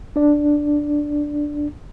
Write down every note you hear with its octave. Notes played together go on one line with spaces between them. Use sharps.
D4 D5